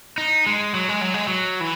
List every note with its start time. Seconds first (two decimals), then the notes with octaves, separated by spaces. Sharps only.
0.18 D#4
0.46 G#3
0.74 F#3
0.89 G#3
1.01 F#3
1.14 G#3
1.28 F#3
1.60 E3